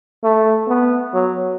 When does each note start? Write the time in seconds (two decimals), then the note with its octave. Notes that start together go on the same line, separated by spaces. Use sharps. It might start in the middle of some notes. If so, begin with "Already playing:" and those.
0.24 A3
0.68 B3
1.14 F#3